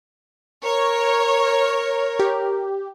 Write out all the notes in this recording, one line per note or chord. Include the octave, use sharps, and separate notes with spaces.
A#4 C#5
G4